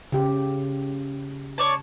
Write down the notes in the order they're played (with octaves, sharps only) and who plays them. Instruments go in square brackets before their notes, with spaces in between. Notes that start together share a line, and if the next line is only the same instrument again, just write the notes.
[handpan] C#3 G4
[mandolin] C#5 D5 A5